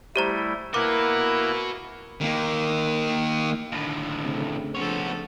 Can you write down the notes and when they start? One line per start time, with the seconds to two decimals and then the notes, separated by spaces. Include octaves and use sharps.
0.16 G3 A3 E4 G4 C5 A#5
0.74 A#3 E4 F#4 A#4 B4 F#5 D6
2.21 D#3 A#3
3.72 D#2 A2 D3
4.24 C#3 A3 C4
4.75 G2 F3 B3 A4 C#5